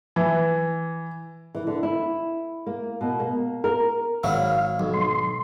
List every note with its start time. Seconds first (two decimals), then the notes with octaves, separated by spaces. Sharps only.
0.16 E3
1.55 E3
1.67 D3
1.83 E4
2.66 A#3
3.01 B2
3.20 A#3
3.64 A#4
4.23 G#1 F#3 E4 F5
4.79 B1 F#3
4.94 C6